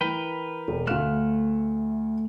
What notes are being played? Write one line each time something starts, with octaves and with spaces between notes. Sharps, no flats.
E3 A#4 B4 G5
E1
D2 A3 F5 F6 F#6 E7